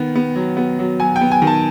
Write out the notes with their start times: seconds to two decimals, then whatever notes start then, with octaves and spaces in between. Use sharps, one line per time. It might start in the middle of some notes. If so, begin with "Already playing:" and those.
Already playing: D#3 B3
0.15 B3
0.36 F#3
0.57 B3
0.79 F#3
1.00 F#3 G#5
1.16 G5
1.21 B3
1.32 G#5
1.42 D#3
1.47 A5